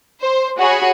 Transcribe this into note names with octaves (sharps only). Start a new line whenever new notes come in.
C5
F#4 G#4 C#5 F#5 G#5 B5